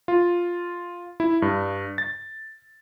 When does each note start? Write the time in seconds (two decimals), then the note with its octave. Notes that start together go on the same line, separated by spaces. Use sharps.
0.08 F4
1.20 E4
1.42 G2
1.98 A6